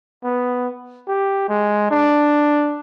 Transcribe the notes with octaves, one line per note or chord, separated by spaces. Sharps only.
B3
G4
G#3
D4